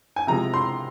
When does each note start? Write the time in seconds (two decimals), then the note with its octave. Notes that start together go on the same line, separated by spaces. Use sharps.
0.16 G#5
0.27 C3 F3 G#3 A#5
0.54 C6